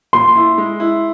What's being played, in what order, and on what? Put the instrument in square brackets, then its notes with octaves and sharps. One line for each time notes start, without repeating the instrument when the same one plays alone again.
[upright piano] A#2 [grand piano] C6
[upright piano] E4
G#3
E4